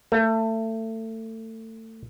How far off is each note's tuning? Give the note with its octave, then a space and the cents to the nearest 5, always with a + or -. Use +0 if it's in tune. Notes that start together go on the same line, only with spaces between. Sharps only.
A3 +25